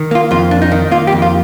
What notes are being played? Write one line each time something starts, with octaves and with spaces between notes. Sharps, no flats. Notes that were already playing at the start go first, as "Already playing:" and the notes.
Already playing: D#3
A#3 F4
F2 F4
D4
D#4
D#3
A#3 F4
G4
F2
F4